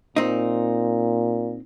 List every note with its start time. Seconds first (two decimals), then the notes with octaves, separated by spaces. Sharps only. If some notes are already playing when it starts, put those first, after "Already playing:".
0.16 A#2 C4 D#4